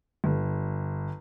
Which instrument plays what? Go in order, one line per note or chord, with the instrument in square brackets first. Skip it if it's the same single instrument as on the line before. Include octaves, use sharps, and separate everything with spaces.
[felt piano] G1